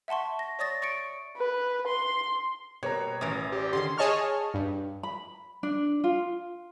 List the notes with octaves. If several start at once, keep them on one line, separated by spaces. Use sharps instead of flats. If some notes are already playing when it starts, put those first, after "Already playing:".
E5 F#5 A5 C6 C#6
A#6
C#5 D5 C#6 D#6 A6 A#6
C#6 A6 C#7 D7
B4
C6
B2 G3 A#3 B3 C#5 A#5
A1 E3 C#4 A#4 C6 D#6
G4 C#5 D5
D3 D#3 C#4 C6
G#4 C#5 D#5 A5 C#6 F6
G2
B5
D4
F4